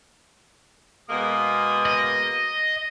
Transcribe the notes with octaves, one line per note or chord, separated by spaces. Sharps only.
B2 G#3 A#3 D#6
D#5